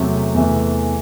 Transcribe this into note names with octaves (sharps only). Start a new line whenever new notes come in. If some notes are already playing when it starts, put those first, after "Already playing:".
Already playing: E2 C3 F#3 A3
E2 C3 E3 A3